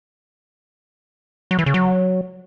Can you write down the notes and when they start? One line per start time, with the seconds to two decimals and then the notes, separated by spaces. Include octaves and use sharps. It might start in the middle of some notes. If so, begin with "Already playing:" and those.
1.51 F#3
1.59 E3
1.66 C#3
1.74 F#3